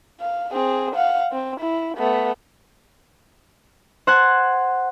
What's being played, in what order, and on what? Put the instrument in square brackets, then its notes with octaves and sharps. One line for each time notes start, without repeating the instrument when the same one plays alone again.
[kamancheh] F5
C4 G#4
F5 F#5
C4
E4
A3 B3
[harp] C5 F#5 A5 F#6 G#6